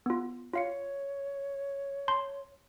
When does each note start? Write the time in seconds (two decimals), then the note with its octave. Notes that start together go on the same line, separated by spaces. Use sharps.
0.06 B3 F4
0.53 F4 C#5 F5 C#7
2.08 A5 C6 G6